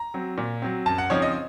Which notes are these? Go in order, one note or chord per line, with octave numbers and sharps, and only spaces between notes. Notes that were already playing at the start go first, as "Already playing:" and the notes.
Already playing: A#5
F#3 C4
A#2
F#3 C4
F#2 A5
F#5
C#3 F3 C4 D#4 C#5
D#5